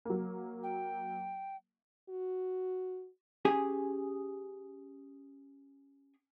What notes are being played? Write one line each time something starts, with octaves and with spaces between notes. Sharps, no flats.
F#3 A#3
G5
F#4
C#4 G4 G#4 G#5